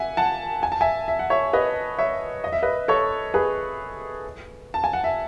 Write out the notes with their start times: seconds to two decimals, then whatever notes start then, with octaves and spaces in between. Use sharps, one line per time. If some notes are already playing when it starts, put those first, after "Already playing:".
Already playing: E5 F#5 G#5
0.17 F#5 A5
0.63 G#5
0.72 A5
0.81 E5 G#5
1.08 E5
1.19 F#5
1.30 C#5 E5
1.53 B4 D#5
1.98 C#5 E5
2.44 D#5
2.52 E5
2.63 B4 D#5
2.88 A4 C#5
3.34 G#4 B4
4.74 A5
4.84 G#5
4.93 F#5
5.04 E5